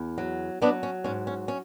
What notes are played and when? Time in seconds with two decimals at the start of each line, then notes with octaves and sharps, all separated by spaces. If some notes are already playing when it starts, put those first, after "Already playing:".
Already playing: E2
0.18 F#3
0.62 F#3 B3 D4
0.83 C#4
1.04 G#2 C#4
1.27 C#4
1.48 C#4